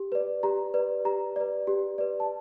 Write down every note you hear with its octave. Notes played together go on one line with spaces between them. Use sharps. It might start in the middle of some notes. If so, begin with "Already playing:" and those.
Already playing: G4
B4 D5
G4 A#5
B4 D5
G4 A#5
B4 D5
G4
B4 D5
A5